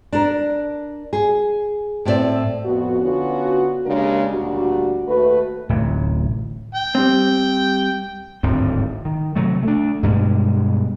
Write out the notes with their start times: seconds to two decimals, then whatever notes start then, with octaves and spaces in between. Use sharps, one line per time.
0.13 D4 A#4
1.13 G#4
2.05 A2 A3 B3 C4 D5 E5
2.65 F2 B3 F#4
3.02 D3 B3 C#4 F4 F#4
3.86 C#3 G#3 A#3 D4 G4 A#4
4.31 D2 A#2 G3 D4 F#4
5.08 D#2 A3 F#4 B4
5.69 D1 A1 A2 C3
6.75 G5
6.95 G3 C4
8.43 D1 G#1 G2 C4
9.05 D#3
9.36 C3 F#3 A3
9.63 A3 D4
10.03 G2 B2 G3 G#3